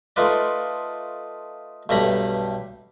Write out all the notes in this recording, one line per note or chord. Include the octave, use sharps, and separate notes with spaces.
A3 D#4 F4 B4 D5
B1 G2 G3 A3 A#5 B5